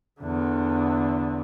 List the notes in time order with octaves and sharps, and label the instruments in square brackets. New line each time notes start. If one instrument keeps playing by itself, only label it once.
[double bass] E2 D3